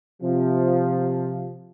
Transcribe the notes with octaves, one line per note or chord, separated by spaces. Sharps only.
C3 F3